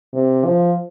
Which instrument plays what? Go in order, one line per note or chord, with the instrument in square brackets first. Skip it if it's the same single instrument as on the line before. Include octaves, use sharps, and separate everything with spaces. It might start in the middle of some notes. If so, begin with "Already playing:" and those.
[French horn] C3
F3